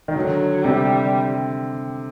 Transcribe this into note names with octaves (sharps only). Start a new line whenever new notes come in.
D#3
D3 F#3
C3 G3